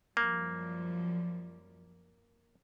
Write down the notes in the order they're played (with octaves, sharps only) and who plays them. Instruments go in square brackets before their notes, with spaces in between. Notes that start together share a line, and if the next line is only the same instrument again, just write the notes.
[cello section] F#2 F3 G3 [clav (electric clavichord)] A#3